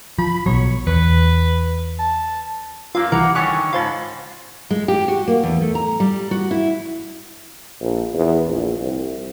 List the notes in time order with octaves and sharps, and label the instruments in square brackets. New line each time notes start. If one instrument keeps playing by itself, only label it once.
[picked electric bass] F3 [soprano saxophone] B5
[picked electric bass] B1 B2 F#3 [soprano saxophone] C#5
[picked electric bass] E2 [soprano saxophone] B4
[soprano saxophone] A5
[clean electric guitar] F#2 A#3 [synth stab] F4 [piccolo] E6
[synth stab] C2 E3 A#4 [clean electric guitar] A#3 [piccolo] F#5
[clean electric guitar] D3 D#3 C#5 [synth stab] F#5 B5 C#6 [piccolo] G#5
[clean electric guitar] G#2 C#3 [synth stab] F4 C5 A5 [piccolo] B5
[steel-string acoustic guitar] G#3
G4
F#4
A#3
E2
A3
A#5
G3
F#4
E4
[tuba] A#1
E2
A#1
C2